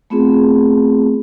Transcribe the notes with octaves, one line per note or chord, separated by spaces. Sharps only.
A3 B3 C4 F4 G#4